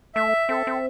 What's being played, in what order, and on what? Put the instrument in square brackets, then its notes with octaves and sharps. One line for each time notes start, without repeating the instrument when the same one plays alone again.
[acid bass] A3 [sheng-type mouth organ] E5
[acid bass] C4 [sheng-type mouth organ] A4
[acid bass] C4